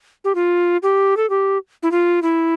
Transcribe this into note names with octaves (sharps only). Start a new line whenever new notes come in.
G4
F4
G4
A4
G4
E4
F4
E4